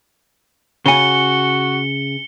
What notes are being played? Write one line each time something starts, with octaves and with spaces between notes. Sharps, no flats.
C#3 F#4 G#5 C#7 G7